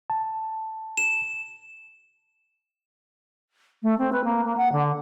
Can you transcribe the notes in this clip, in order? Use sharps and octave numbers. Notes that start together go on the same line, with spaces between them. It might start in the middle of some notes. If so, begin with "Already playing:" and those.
A5
E7
A3
C4
B4
A#3
A#3
F#5
D3